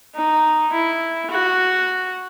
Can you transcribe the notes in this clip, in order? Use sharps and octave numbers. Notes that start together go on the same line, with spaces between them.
D#4
E4
F#4